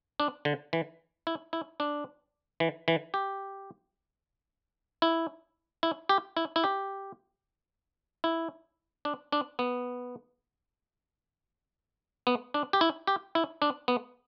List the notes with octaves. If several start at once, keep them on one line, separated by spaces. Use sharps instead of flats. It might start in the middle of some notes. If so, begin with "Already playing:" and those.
D4
D3
E3
E4
E4
D4
E3
E3
G4
E4
E4
G4
E4
E4
G4
E4
D4
D4
B3
B3
D4
G4
E4
G4
E4
D4
B3